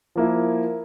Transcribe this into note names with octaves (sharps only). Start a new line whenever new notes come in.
F3 A#3 E4